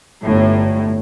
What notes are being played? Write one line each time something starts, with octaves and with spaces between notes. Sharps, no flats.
G1 A2